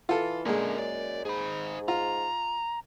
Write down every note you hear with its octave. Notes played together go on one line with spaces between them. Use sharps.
E3 F4 A4
A#2 D3 G#3 C#4 A#4
F#2 D5
G#2 G#4 B5
F4 A#5